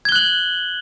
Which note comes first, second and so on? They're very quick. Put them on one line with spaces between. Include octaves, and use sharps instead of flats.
G#6 G7 F#6 F#7